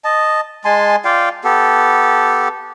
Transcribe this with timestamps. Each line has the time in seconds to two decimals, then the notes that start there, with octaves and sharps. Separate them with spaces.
0.04 D#5 A5
0.65 G#3 G#5 A5 C6
1.05 F4 D5 F5 G5
1.44 B3 G4 A4